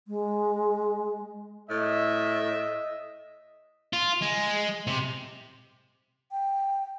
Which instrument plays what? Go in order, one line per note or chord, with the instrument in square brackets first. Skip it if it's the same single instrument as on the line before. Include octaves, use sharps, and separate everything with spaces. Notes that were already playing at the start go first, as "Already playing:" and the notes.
[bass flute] G#3
[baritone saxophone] A2 [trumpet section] D#5 [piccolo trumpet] E5
[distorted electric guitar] F4
G#3
C3
[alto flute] G5